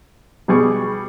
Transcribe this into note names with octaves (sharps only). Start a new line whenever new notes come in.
B2 G3 G#4 C#6 D6